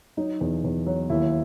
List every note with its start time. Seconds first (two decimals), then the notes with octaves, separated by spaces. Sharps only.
0.17 F#3 D#4
0.41 E2
0.64 E2
0.87 F#3
1.10 D#2 E4